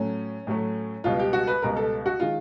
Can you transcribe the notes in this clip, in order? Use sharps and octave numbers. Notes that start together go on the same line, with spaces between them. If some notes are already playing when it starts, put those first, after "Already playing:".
Already playing: A2 F#3 A3 C#4
A2 F#3 A3
C#2 B2 G3 F4
G4
F#4
B4
C#2 B2 G3 A#4
A4
F#4
D#3 G#3 F4